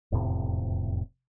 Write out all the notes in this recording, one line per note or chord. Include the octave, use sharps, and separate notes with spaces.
E1 F2 A2 C3